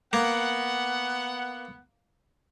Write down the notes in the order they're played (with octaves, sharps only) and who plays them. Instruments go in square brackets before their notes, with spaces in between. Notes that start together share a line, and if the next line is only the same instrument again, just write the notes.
[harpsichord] A#3 [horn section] B3 F#5